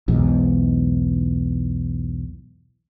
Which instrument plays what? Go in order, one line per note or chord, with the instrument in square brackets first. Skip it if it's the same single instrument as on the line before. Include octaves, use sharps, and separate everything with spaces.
[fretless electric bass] B1 E2 G#2